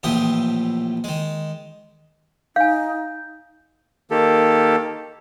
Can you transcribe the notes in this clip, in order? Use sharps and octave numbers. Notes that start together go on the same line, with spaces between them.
A#1 A2 E3 F3 G4 D#6
D#3 G#3
D#4 F5 G#5 G6
D#3 A#3 G4 A4